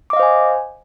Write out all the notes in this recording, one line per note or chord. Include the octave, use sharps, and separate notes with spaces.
C5 D#5 F5 G#5 D6